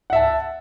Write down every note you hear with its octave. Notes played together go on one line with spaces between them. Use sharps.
E5 F#5 A5